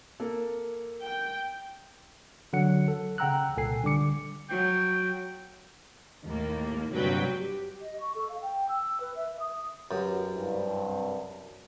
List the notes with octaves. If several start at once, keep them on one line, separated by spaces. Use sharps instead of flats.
A#3 A4
G5
D3 F#3 F#5 C#7
A4
C#3 F#5 G5 A#5 E6 F#6
C2 A#2 A4 G#5 C7
D3 G3 D6 C#7
F#3 G5
D#2 A2 A#3
G1 C2 G2 F#3 B4 G5
G4
D#5
C#6
A4
F5
G5
E6
B4
E5
D#6
F#2 F#4 G4 B4
C2 G2